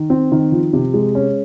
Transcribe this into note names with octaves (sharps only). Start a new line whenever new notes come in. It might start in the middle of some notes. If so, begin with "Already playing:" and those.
Already playing: D#3
C4
D#3
F3
C3
G#3
C#4